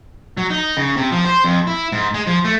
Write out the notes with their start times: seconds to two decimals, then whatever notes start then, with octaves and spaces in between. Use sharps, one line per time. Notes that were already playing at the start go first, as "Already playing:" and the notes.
0.37 F#3
0.50 D#4
0.77 C#3
0.97 C3
1.12 F3
1.25 C5
1.44 F2
1.67 E4
1.92 G#2
2.14 G#3
2.27 F3
2.45 A3